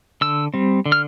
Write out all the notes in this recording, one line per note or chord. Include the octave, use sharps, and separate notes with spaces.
D3 E6
G3 C4
D3
F6